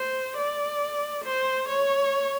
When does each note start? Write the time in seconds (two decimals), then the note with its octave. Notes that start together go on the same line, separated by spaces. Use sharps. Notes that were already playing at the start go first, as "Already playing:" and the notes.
Already playing: C5
0.37 D5
1.24 C5
1.68 C#5